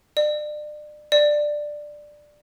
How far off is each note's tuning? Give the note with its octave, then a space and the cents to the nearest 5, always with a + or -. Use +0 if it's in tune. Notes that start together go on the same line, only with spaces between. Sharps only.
D5 +35
D5 +10